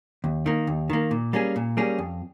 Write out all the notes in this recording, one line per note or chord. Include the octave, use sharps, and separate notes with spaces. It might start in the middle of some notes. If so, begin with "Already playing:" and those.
D#2
D#3 A#3
D#2
D#3 A#3
A#2
G3 A#3 C#4 G#4
A#2
G3 A#3 C#4 G#4
F2